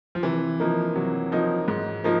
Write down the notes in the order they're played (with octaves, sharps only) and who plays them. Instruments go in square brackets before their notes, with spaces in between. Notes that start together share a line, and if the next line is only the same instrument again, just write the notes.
[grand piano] F3
[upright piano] C3 [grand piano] E3
[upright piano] F3 A#3 D#4
[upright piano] C3 [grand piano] F#3
[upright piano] F3 A#3 D#4
G#2
F3 A#3 D#4